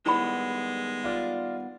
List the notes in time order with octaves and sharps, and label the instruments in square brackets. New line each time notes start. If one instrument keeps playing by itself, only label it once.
[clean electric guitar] D#3 G3 B3 [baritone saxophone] G#3 [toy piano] E4 G5 B5
[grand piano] F4 D5 F6